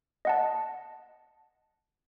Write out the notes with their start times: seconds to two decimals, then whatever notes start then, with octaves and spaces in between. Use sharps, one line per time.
0.25 D#5 F#5 A5